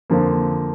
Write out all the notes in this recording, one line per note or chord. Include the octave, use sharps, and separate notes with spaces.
F2 D3 F3 A#3